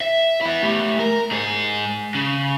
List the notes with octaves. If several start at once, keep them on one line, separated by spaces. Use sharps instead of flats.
E5
B3 E4
A3 G4
A#4
G#2 G#4
C#3